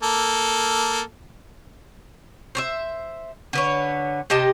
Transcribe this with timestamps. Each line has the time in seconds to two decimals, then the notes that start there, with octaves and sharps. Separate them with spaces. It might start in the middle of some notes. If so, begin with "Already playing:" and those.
0.03 A#3 A4
2.55 C5 C#5 E5
3.53 D3 B4 C#5
4.30 C3 G4 D#5 A5